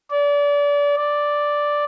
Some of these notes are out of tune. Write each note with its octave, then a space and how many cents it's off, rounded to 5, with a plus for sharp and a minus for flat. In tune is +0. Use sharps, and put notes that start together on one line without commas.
D5 -30
D5 +0